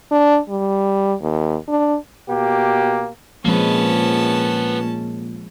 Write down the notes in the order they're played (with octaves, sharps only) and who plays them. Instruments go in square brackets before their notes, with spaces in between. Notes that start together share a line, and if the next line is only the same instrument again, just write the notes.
[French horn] D4
G3
D#2
D4
[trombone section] B2 A#3 G4
[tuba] A#2 [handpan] F3 G#3 C4 [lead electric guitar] A#3 B4 [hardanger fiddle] C#4 A5